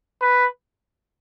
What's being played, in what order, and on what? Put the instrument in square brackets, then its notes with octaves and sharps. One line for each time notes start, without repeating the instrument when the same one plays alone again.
[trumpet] B4